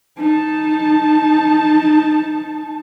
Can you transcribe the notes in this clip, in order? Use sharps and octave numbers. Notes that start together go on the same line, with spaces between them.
D#4 A5